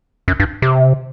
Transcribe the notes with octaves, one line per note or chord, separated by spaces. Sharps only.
F#2
G2
C3